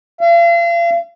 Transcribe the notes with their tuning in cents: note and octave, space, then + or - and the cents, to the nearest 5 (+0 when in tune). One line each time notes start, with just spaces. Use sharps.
F5 -40